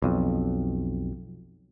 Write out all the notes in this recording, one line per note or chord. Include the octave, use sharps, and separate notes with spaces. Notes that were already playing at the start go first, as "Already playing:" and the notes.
B1 F2